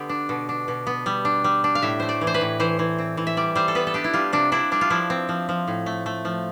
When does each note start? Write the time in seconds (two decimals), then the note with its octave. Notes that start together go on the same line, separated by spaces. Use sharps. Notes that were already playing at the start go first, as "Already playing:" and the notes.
Already playing: D3 B3 G4
0.09 D4
0.29 B2
0.49 D4
0.68 B2
0.87 B3
1.06 G3
1.25 D4
1.44 G3
1.64 D4
1.75 F5
1.82 A2 E5
2.00 A3 C5
2.09 D5
2.21 E3
2.27 C5
2.34 B4
2.41 A2
2.60 E3 C5
2.79 E3
2.98 C4
3.17 E3
3.27 E5
3.37 G3 D5
3.55 G3 C5
3.68 A4
3.75 B3 B4
3.87 A4
3.94 D4 G4
4.04 E4
4.13 G3 F4
4.33 C3 D4
4.52 D4 E4
4.71 G3 D4
4.81 F4
4.90 F3 E4
5.10 C4
5.29 F3
5.49 F3
5.68 A2
5.86 A3
6.06 A3
6.25 F3